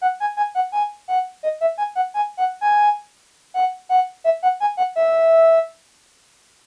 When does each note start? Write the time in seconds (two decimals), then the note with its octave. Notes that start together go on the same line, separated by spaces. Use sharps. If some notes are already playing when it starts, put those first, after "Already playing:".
0.01 F#5
0.20 G#5
0.37 G#5
0.55 F#5
0.72 G#5
1.08 F#5
1.43 D#5
1.61 E5
1.78 G#5
1.95 F#5
2.14 G#5
2.37 F#5
2.61 G#5
3.54 F#5
3.89 F#5
4.24 E5
4.43 F#5
4.60 G#5
4.77 F#5
4.96 E5